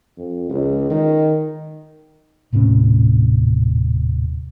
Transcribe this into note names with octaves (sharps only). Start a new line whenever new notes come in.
F2
C#2
D#3
D#1 A2 C3 C#4